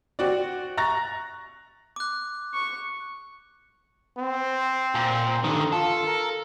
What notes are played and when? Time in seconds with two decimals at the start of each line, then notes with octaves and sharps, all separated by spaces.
0.19 C4 F#4 D5
0.77 A#5 C#6 F#6 A6 A#6
1.96 D6 F#6
2.54 C#6
4.18 C4
4.95 A#2
5.44 G2 D3 D#3
5.73 F4 A4
6.07 A#4